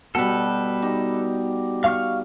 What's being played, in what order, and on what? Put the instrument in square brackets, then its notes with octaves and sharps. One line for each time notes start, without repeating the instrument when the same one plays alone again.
[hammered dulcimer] B2 G3 [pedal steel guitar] A4 B4
[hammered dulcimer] D#4 G4
[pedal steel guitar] F5 C#6 F6